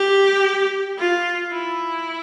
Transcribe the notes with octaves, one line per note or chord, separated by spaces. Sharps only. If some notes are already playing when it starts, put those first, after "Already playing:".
Already playing: G4
F4
E4